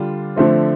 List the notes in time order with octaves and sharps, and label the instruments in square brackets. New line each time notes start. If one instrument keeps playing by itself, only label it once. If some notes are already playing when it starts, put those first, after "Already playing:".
Already playing: [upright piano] D3 G3 D4 F4
D3 F3 A3 C4